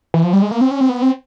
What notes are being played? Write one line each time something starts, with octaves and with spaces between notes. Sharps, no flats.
E3
F3
G3
G#3
A#3
C4
C#4
C4
B3
C4